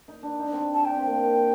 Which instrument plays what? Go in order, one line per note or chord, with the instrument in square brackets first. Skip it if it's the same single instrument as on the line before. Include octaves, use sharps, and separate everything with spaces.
[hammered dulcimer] D#4
D4
D#4
D4
C4
D4
[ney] A5
[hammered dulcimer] D4 [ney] G5
[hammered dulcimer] C4
A#3
C4